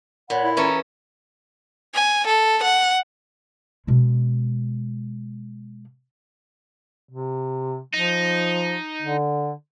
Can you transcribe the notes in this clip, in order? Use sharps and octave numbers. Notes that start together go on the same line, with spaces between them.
A#2 C#5 F#5 B5
E4
E3 C#4 A4 A#5
G#5
A4
F#5
B2 G#3
C3
F3 D#4
D3